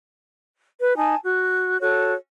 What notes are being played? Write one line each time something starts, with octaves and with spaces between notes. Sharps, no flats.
B4
D#4 G#5 A5
F#4
F#4 A4 C#5